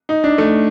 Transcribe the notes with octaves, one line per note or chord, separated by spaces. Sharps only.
D#4
D4
A3